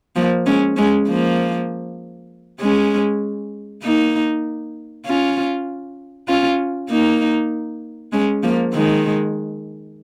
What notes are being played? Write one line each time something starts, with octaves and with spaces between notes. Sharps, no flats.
F3 A#3
G#3 C#4
G#3 C#4
F3 A#3
G#3 C#4
A#3 D#4
C#4 F4
C#4 F4
A#3 D#4
G#3 C#4
F3 A#3
D#3 G#3